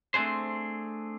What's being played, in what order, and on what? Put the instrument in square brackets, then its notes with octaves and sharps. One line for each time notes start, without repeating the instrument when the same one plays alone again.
[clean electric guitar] A3 C4 D4 G#4 C5